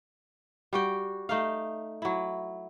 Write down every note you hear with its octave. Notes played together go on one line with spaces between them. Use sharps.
G3 F#4 G5
A3 D#4 F5
F#3 E4